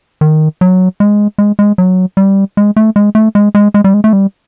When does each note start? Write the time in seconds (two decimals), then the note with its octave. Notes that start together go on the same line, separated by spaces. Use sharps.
0.21 D#3
0.61 F#3
1.00 G#3
1.38 G#3
1.59 G#3
1.78 F#3
2.17 G3
2.57 G#3
2.76 A3
2.96 G#3
3.15 A3
3.35 G#3
3.55 G#3
3.74 G#3
3.84 G3
3.94 G#3
4.04 A3
4.13 G3